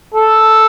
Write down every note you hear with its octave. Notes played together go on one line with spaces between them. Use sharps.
A4